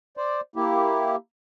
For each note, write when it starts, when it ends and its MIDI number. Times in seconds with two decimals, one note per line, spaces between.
0.17 0.41 72
0.17 0.41 74
0.56 1.16 58
0.56 1.16 64
0.56 1.16 67